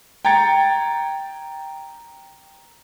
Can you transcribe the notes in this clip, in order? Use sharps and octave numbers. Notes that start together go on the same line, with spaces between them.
G5 A#5 G#6 A6 C#7